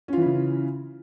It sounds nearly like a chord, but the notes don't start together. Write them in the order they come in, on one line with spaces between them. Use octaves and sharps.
C#4 F4 E3 E4 C#3